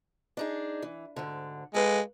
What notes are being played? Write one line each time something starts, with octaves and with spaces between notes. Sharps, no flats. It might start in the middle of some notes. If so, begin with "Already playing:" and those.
D4 D#4 G#4
E3
D2 G#2 D3
G#3 A4 B4 F5